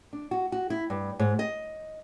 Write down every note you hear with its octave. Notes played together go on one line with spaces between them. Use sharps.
D4
F#4
F#4
E4
G2
G#2
D#5